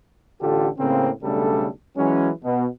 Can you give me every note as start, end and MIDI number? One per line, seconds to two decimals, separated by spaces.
0.41 0.68 33
0.41 0.68 50
0.41 0.68 65
0.41 0.68 67
0.41 0.68 69
0.78 1.09 45
0.78 1.09 49
0.78 1.09 58
0.78 1.09 60
1.22 1.67 35
1.22 1.67 49
1.22 1.67 55
1.22 1.67 57
1.22 1.67 62
1.22 1.67 69
1.96 2.29 52
1.96 2.29 54
1.96 2.29 56
1.96 2.29 61
2.43 2.65 47